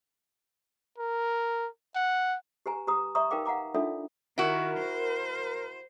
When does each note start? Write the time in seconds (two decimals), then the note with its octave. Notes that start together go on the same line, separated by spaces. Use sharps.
0.98 A#4
1.95 F#5
2.66 G4 B4 G#5 A#5
2.87 G4 B4 A#5 D#6
3.15 D5 E5 A#5 C#6 D#6
3.31 D#4 A#4 B4 F5 G5 D6
3.45 F5 F#5 A#5 D6
3.74 D4 D#4 F4 A4 D5 E5
4.38 D#3 E4 F#4 A#4
4.79 C5